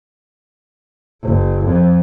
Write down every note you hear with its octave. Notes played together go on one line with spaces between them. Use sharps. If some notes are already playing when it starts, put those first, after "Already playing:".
F#1
F2